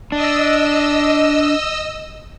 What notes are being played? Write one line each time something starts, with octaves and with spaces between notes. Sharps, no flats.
D4 D#5 E6